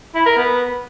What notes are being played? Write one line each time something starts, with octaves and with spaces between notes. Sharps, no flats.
E4
A#4
B3